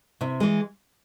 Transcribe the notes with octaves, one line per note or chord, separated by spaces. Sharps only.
C3 E4
E3 G#3